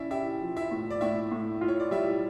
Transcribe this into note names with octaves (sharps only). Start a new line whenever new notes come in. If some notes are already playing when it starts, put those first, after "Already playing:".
Already playing: C#4 E4 D5 E5
E4 G4 E5
F3
E4 E5
A2
D5
A2 E4 E5
A2
F4
C#5
D5
G3 E4 E5